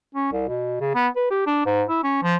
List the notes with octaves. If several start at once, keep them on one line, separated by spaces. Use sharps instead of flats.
C#4
C2
B2
C#3
B3
B4
G4
D4
G#2
E4
C#4
F3